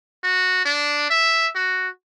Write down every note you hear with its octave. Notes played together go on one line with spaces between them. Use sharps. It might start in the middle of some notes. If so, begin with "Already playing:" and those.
F#4
D4
E5
F#4